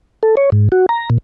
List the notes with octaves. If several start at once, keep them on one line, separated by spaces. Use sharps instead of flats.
A4
C#5
G#2
F#4
A#5
A#2